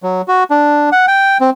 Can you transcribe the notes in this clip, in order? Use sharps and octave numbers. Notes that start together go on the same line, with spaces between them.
F#3
F#4
D4
F#5
G5
C4